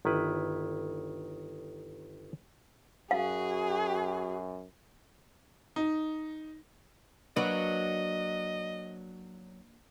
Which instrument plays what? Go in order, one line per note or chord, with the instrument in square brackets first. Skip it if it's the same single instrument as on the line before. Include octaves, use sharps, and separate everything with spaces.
[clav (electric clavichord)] G1 D#3 E4 B4
[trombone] F#2 [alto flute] F#4 [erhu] G#4 [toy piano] F5
[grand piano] D#4
[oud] F#3 [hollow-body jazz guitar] A#3 D4 B4 [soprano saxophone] D#5